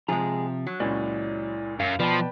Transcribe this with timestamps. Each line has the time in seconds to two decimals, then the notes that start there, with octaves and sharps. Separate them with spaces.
0.08 C3 F3 G#3 G#4 A#5
0.67 F#3
0.80 C#2 A#2 C#4 E4 D5
1.80 F#2 F5
2.00 B2 F3 B4 D5 G5 A5